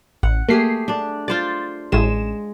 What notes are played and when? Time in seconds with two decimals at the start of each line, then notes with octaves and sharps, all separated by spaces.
0.23 A1 F#5
0.49 A3 A#3 G4 G#4 C7
0.88 D4 D5
1.28 F4 C5 D5 A6
1.92 A1 G#3 E7